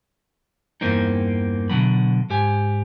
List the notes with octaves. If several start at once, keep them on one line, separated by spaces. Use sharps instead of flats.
E2 G2 E3 A#3 C4 D#4
B2 D3 F#3 B5
G#2 G4 G#5